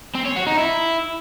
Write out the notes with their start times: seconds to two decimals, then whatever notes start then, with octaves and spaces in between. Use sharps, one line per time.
0.15 C4
0.25 C#5
0.36 F#4
0.47 D#4
0.57 E4